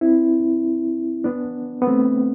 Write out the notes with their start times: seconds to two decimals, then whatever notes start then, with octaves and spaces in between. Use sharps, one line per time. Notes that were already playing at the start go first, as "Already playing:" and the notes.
0.01 C4 E4
1.24 B3 D4
1.82 B3
1.87 A3 C4